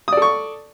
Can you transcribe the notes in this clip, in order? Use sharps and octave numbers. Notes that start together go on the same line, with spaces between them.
A4 D5 C#6 D#6